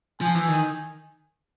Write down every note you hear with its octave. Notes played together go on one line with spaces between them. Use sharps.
F3 G#5
E3
D#3